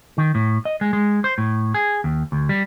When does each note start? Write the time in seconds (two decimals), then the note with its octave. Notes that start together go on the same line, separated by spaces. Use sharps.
0.18 D#3
0.35 A2
0.65 D#5
0.81 G#3
0.93 G#3
1.24 C5
1.38 A2
1.74 G#4
2.04 D#2
2.32 D2
2.49 G3